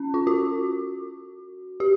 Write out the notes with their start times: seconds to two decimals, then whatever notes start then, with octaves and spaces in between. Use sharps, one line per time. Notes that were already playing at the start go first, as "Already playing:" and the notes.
Already playing: C#4
0.14 F4
0.27 F#4
1.80 G4